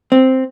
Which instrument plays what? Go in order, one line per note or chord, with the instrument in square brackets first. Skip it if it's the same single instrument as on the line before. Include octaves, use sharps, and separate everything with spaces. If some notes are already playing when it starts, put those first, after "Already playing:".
[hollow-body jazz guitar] C4